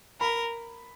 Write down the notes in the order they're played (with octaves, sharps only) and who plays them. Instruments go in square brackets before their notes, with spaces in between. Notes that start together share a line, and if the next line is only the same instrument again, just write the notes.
[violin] A#4 [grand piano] B5